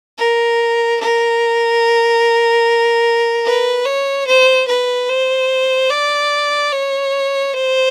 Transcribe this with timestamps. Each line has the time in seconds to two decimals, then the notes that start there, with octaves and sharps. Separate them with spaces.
0.18 A#4
1.00 A#4
3.45 B4
3.85 C#5
4.27 C5
4.67 B4
5.09 C5
5.90 D5
6.72 C#5
7.53 C5